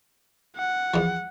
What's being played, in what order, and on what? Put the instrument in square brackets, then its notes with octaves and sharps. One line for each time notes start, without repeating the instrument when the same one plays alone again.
[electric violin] F#5
[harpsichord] E2 F3